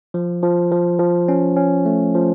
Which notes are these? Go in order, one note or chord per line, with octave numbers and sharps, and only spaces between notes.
F3
F3
F3
F3
C#4
C#4
A3
F3